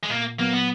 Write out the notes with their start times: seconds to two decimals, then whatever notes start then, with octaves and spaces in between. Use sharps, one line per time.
0.03 G#3
0.10 A#2 A#3
0.39 F#3 A#3 B3
0.53 B3